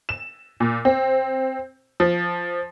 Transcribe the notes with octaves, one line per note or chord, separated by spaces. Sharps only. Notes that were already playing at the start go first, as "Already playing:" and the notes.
E7
A#2
C4
F3